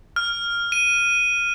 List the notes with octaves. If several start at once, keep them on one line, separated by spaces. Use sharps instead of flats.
F6
D#7